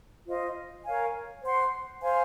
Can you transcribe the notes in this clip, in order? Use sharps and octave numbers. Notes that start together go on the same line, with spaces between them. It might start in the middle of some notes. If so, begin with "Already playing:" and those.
F4 C5 D#5
A#4 C#5 F5 G#5
C5 F#5 C6
C5 F5 G#5 C6